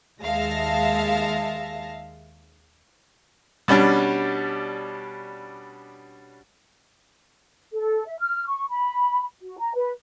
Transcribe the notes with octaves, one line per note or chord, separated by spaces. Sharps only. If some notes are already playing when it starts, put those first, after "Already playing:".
D#2 G#3 E5 F5 A5 A#6
B2 G3 C#4 D4
A4
E5
F6
C#6
B5
F#4
A#5
B4